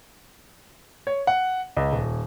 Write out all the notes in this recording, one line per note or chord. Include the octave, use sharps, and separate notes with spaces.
C#5
F#5
C#2
D#1